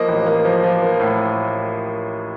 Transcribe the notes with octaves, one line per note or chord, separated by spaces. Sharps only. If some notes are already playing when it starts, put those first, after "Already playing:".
Already playing: F3 A#3 D#5
A1
A#3
F3
F3
A#3
A2